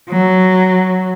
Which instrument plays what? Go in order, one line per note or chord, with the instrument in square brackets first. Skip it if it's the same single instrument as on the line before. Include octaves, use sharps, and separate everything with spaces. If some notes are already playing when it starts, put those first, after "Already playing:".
[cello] F#3